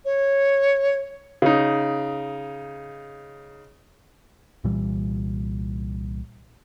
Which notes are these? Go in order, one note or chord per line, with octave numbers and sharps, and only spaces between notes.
C#5
C#3 D#4
C2 A#2 E3 G3